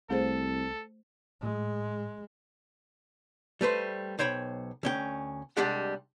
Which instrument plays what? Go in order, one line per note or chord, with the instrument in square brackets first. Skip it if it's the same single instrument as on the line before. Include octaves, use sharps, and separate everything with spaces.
[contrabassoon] C2 [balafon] A3 G#4 C5 [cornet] A4
[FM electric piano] A2 [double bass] G#3
[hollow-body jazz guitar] G3 A3 B4 C5
B1 C5 C#5 G5 B5
D2 C#4 G5
C2 G3 G#3 D4 G4 F#5